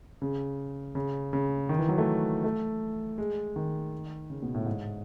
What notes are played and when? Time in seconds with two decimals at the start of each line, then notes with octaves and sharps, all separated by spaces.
0.22 C#3
0.95 C#3
1.33 C#3
1.69 D#3
1.79 E3
1.89 F#3
1.98 A3
2.44 A3
3.18 G#3
3.56 D#3
4.30 C#3
4.42 B2
4.54 A2
4.66 G#2